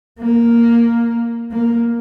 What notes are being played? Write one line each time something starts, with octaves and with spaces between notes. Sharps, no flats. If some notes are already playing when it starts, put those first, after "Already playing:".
A#3
A#3